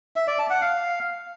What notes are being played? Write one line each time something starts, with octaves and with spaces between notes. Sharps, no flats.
E5
D5
A5
F#5
F5